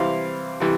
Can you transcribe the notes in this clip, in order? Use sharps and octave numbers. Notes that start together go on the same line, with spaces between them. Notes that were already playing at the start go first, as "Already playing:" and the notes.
Already playing: C3 E3 G3 C4 E4 F5
C3 E3 G3